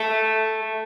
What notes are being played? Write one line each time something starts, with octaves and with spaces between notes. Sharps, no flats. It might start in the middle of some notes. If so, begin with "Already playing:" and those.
Already playing: A3